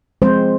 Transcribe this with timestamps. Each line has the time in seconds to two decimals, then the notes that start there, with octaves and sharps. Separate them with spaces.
0.22 F3 G#3 C4 C5